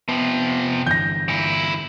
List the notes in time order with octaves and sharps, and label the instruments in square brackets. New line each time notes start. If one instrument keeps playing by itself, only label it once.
[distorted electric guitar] C3 F3 [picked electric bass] B3
[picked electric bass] G2 D3 E3 [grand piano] G6 A#6
[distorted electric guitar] A#2 E4